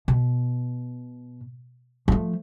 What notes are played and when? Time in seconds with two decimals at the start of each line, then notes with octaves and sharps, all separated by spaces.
0.08 B2
2.08 F3 A3